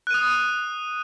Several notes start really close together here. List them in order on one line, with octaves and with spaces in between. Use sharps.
F#6 D#7 D#6